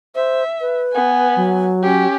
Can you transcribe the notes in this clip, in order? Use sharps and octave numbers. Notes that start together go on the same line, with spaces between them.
C5 E5
B4
B3 G#5
F#3
C#4 G4